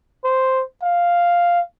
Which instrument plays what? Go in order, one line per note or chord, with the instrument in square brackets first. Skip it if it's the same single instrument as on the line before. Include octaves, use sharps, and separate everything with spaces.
[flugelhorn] C5
F5